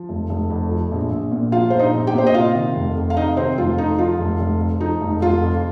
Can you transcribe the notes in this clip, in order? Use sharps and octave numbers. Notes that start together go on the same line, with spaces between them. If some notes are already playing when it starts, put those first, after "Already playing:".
Already playing: F3
F1
F1
F2
F3
A#1
A#1
A#2
F3 F4 F5
A#1 C5
D#4 D#5
A#1
G4 G5
A#2 C5
D#5
C3 F4 F5
D#3
F1
F2
F5
C3 D#4 D#5
D#3 C4 C5
F1 F4
F2 D#4
F3 F4
F1
F1
F2
F3 D#4
F1
F1 F4
F2